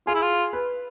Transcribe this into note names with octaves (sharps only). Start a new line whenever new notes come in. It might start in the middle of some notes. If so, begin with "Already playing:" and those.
F4 G#4
E4
F4
B4